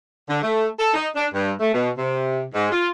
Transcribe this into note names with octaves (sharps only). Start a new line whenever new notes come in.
D3
A3
A4
D#4
D4
G2
A3
B2
C3
G#2
F4